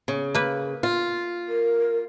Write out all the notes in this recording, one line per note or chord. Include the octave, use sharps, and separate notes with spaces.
C#3
A#3 B4
F4
A#4